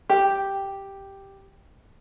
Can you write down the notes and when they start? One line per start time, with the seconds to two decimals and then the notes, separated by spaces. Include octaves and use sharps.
0.09 G4 G5